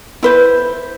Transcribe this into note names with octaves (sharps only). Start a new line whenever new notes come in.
E4 B4 C5